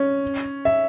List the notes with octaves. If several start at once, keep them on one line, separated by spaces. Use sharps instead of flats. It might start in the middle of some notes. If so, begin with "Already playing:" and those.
Already playing: C#4
E5